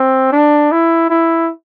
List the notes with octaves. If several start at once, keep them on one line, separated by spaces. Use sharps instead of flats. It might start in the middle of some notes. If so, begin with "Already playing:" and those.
Already playing: C4
D4
E4
E4